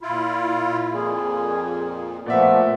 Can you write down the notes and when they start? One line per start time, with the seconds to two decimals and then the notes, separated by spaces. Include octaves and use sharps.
0.02 A#2 E4 F4
0.92 F2 A#2 G#4
2.26 A#2 F3 A3 B3 D5 E5